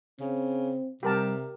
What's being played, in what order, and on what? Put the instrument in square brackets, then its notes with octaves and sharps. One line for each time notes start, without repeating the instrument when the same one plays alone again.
[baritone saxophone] C#3 [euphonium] C4
[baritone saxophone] C3 [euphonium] G3 [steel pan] G4 A#4 A5